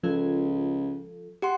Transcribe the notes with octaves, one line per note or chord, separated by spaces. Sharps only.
C#2 F3 F4 A4
G4 F#5 C6